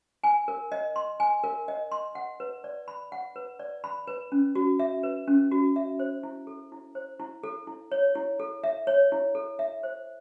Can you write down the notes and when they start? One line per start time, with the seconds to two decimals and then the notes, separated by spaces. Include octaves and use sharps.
0.24 G#5
0.48 A#4
0.72 D#5
0.96 C6
1.20 G#5
1.44 A#4
1.68 D#5
1.92 C6
2.15 F#5
2.40 B4
2.64 D5
2.88 B5
3.12 F#5
3.36 B4
3.59 D5
3.84 B5
4.07 B4
4.32 C#4
4.55 F#4
4.79 E5
5.03 B4
5.28 C#4
5.51 F#4
5.76 E5
5.99 C5
6.23 E4
6.47 A4
6.72 E4
6.95 C5
7.20 E4
7.44 A4
7.67 E4
7.92 C#5
8.15 E4
8.40 A4
8.64 E5
8.87 C#5
9.12 E4
9.35 A4
9.59 E5
9.83 C5